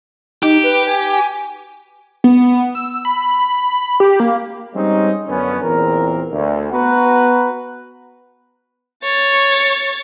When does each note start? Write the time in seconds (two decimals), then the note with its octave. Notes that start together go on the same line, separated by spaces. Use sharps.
0.43 D#4 G4
0.64 B4
0.87 G#5
2.24 B3
2.75 E6
3.05 B5
4.00 G4
4.20 A#3
4.75 G3 G#3 C4 C#4 D#4
5.27 F#2 D3 B3 C#4
5.63 E2 A#2 C4 A#4
6.31 D2
6.72 B3 F#4 B4 F#5 A#5
9.03 C#5 A6